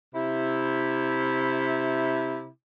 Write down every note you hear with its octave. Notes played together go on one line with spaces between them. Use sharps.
C3 E4